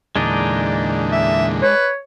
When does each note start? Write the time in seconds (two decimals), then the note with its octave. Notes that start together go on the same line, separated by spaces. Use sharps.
0.16 E2 A#2 D3 G#3 D4 D#4
1.12 E5
1.62 B4 C#5